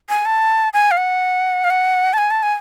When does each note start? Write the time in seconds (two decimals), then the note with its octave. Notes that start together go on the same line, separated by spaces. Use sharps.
0.09 G#5
0.26 A5
0.73 G#5
0.91 F5
0.97 F#5
1.64 F5
1.70 F#5
2.13 A5
2.18 G#5
2.31 A5
2.43 G#5